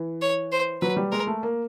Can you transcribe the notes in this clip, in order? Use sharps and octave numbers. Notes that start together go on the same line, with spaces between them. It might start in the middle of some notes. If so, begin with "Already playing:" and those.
Already playing: E3
C#5
C5
F#3 B4
G3
G#3 A#4
A3
A#3